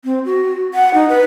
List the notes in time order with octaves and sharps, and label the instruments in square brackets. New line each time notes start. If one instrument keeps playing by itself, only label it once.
[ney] C4
F#4
F#5
D#4
B4